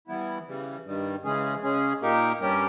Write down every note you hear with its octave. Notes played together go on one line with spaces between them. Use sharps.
E3 G3 B3 E4
C#3 E3 G3
G2 D#3 G3
C#3 E3 G#3 C#4 G#4
C#3 G#3 C#4 G#4
A#2 A#3 D#4 G4 A#4
G2 G3 C#4 G4 A#4